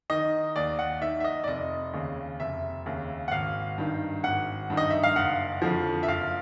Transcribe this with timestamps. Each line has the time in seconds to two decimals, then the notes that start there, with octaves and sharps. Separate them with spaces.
0.10 D#3 D#5
0.56 D#2 D5
0.79 F#5
1.02 D#3 E5
1.20 E5
1.24 D#5
1.44 D5
1.48 F1 D#5
1.93 D#2 C#3
2.40 F1 E5
2.86 D#2 C#3
3.28 F#5
3.32 G#1 F5
3.78 G2 D#3
4.24 G#1 F#5
4.70 G2 D#3
4.77 D#5
4.90 E5
5.03 F5
5.16 F#1 F#5
5.62 F2 D3 F3
6.03 E5
6.08 F#1 F5